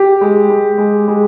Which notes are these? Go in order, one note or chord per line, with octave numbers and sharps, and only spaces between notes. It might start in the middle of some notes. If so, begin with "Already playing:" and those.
Already playing: G4
G#3
G#3
G#3
G#3